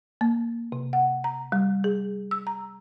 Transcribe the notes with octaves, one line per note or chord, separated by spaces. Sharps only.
A#3
C3
F#5
A#5
G3
G#4
E6
A#5